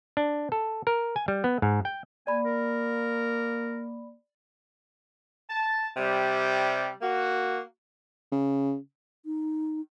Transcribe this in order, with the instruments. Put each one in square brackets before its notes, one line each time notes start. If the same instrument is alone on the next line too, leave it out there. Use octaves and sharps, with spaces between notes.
[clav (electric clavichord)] D4
A4
A#4
G#5
G3
B3
G#2
G5
[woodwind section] A#3 [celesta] D5 B5 [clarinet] G#5
[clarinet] A#4
[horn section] A5
C3 G3
A#3 F#4
[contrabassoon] C#3
[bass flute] D#4